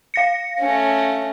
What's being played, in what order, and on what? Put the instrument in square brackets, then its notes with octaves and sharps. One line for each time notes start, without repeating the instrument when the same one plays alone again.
[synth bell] F5 A#6 C#7
[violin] A3 C#4